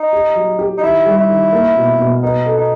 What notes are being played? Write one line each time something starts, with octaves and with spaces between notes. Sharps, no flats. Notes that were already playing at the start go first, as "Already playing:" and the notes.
Already playing: D#4
G4
F#3
G4
D#4
D#3 E4
G3
E4
D#3
A#3
B2
B2
B3 D#4
A4
D#4